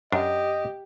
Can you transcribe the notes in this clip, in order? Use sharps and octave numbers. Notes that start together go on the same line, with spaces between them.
F#2 D4 G4 D#5